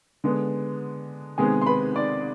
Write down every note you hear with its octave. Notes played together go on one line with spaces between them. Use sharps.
D3 G#3 B3
C3 D#3 G#3 B3 G#4 G#5
C6
B4 B5
D5 D6